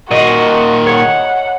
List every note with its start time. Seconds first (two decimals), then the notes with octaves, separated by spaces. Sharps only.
0.11 A#2 D#3 F#4 D#5
0.87 C#5 F#5